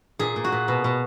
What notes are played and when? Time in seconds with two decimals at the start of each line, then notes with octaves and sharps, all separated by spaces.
0.19 A#2 G#4
0.36 A#2
0.44 F#4
0.52 A#2
0.68 B2
0.84 B2